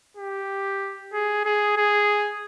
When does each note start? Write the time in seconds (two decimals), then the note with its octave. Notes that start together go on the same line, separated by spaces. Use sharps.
0.17 G4
1.13 G#4
1.45 G#4
1.77 G#4